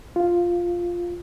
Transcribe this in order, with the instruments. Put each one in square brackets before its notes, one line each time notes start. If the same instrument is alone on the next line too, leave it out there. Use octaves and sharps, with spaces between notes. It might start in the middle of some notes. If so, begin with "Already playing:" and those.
[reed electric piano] F4